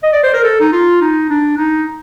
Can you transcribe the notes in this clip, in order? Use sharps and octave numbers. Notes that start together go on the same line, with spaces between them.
D#5
D5
C5
A#4
A4
D#4
F4
D#4
D4
D#4